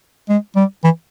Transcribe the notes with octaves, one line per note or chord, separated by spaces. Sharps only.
G#3
G3
E3